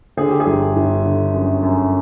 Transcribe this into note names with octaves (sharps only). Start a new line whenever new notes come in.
D3 G#4
G4
G#4
G1
G1
D3
F#2
F#2